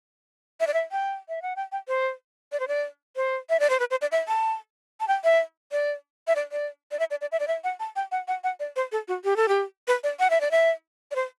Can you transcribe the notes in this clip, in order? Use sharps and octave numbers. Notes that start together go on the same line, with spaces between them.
E5
D5
E5
G5
E5
F#5
G5
G5
C5
D5
C5
D5
C5
E5
D5
C5
B4
C5
D5
E5
A5
A5
G5
E5
D5
E5
D5
D5
D5
E5
D5
D5
E5
D5
E5
F#5
A5
G5
F#5
F#5
F#5
D5
C5
A4
F#4
G4
A4
G4
B4
D5
F#5
E5
D5
E5
D5
C5